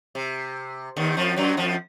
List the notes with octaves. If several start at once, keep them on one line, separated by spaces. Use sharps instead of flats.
C3
D#2 D#3
F2 F3
F#2 F#3
F2 F3